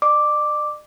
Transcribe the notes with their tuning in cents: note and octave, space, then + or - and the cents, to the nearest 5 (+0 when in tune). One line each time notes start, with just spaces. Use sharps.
D5 +45 D6 +0